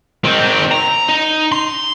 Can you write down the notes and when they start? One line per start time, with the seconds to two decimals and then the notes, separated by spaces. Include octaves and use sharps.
0.24 D#3 C4
0.71 A#5
1.09 D#4
1.52 C6